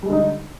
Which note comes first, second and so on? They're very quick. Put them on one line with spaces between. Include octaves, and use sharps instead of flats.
G3 G#3 D3 D#4